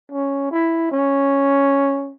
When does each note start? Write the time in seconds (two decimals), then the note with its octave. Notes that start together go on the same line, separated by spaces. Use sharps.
0.12 C#4
0.51 E4
0.92 C#4